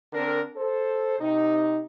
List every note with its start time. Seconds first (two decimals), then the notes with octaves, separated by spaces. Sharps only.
0.12 D3 C4 D4 A#4
0.57 A4 C5
1.20 C3 D#4